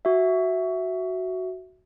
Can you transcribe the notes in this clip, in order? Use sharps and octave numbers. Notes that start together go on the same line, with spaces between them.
F#4 E5